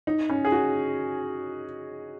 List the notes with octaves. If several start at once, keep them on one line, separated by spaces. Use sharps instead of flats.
D#4
C#4
G#4
F#4